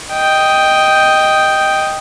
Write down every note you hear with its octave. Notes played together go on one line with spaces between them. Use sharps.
D#5 G5